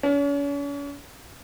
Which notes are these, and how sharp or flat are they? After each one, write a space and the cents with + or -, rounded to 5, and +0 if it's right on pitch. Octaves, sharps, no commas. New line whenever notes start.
C#4 +40